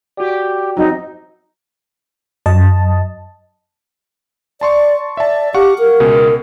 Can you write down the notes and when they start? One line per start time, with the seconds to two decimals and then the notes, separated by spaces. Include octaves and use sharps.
0.17 F#4 G4 D5
0.77 F#3 C4 D#4
2.46 F#2 F#3 D#5 A5
4.61 D5 A5 C6 C#6
5.17 D5 E5 A5
5.54 G4 F5 F#5 C#6
5.79 A#4
6.00 C#2 B2 G#4